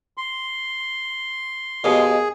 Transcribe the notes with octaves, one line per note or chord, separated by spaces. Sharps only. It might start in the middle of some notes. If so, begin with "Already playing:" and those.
C6
D#2 B2 G#4